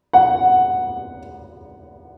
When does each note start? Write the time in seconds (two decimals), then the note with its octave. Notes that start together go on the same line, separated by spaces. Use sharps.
0.13 F#5